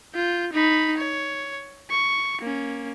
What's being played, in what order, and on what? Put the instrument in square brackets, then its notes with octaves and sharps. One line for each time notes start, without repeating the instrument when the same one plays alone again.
[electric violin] F4 G6
D#4 B5
C#5
C#6
A#3 C#4